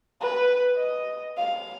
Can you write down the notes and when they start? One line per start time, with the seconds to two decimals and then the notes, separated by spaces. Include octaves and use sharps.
0.21 B4
0.76 D#5
1.37 F5